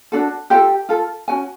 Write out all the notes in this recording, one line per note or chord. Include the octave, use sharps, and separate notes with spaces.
D4 F#4 A4
F4 G4 A4 G5
F4 A4
C#4 F#4 G#5